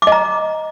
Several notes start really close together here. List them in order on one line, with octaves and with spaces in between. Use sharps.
D6 D#5 A#5